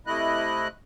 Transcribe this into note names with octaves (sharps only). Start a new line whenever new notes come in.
C3 A3 E4 D#5 F#6